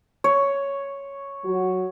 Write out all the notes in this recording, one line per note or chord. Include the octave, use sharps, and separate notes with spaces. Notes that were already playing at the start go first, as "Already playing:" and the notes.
C#5
F#3 F#4